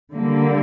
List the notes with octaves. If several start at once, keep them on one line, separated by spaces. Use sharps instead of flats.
D3 G3 A#3